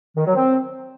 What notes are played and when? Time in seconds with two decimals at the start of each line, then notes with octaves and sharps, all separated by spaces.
0.16 D#3
0.25 F#3
0.35 C4